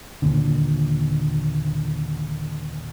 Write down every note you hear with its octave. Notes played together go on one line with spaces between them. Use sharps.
D#2 A#2 D3